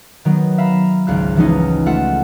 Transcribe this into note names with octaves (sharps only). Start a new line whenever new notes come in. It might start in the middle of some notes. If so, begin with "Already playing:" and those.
D#3 F#3 B3
E5 F5 A#5 B5
G#1 C#2 F5 F#6
E3 F3 G#3 B3 C#4 D#4
A3 F4 E5 F#5